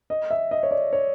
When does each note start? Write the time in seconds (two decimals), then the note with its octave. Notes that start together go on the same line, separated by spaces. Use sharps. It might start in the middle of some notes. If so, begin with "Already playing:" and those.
0.10 D#5
0.31 E5
0.51 D#5
0.63 C#5
0.71 D5
0.93 C#5